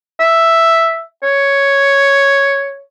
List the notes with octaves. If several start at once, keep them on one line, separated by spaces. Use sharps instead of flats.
E5
C#5